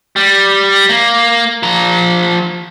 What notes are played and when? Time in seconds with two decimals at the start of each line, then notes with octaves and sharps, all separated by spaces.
0.16 G3
0.89 A#3
1.63 F3 A#5